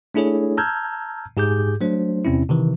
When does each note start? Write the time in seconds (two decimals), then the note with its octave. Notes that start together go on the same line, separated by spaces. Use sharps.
0.14 A3 D4 E4 G#4 A4 C#5
0.57 A5 A#5 E6 F6 G6 G#6
1.37 G#2 G4 G#4 D6 G6
1.81 F#3 A3 D4 C5
2.25 E2 C3 C4 C#4 E4
2.49 C3 D#3 E3